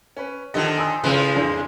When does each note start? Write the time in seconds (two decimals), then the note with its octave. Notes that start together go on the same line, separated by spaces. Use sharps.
0.17 C#4 B4
0.54 D3 D#3 F3 G4 A4 D#5
0.77 G#5 D#6 E6
1.04 A2 C#3 F3 G#3 B4 F5
1.36 F2 D3 E3 D4